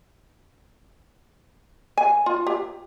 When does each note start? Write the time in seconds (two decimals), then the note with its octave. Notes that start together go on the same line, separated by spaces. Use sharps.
1.98 G#5
2.26 F4
2.47 G4